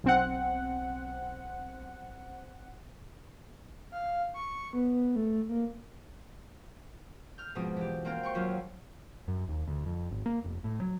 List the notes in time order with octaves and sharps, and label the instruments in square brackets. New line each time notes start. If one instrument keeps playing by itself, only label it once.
[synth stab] B1 C4 F#5
[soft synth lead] F5
C#6
B3
A3
A#3
[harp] F6 G6
G#2 B2 F3 C4 D#6
E3 G4
A#3 C4 C5 F5 G5
G5 C6 C#6 G6
D#2 F#3 F4
[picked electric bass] F#2
D#2
D2
F2
G#1
A#3
F1
A2
F#3